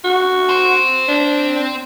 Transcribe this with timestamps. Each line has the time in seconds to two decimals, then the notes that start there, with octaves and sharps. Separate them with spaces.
0.04 F#4
0.49 C4 C5
1.08 D4